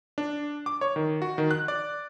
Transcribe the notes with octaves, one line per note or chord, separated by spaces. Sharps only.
D4
D6
C#5
D#3
F#4
D#3
F#6
D5